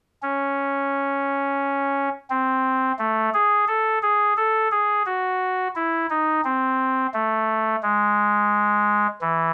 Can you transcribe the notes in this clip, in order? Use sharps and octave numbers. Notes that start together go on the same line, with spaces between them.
C#4
C4
A3
G#4
A4
G#4
A4
G#4
F#4
E4
D#4
C4
A3
G#3
E3